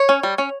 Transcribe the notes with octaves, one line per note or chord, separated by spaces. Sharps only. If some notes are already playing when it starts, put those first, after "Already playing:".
Already playing: C#5
C#4
G3
C#4